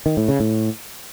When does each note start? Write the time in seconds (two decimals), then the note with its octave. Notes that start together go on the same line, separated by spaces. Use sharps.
0.06 D#3
0.17 A2
0.28 C#3
0.40 A2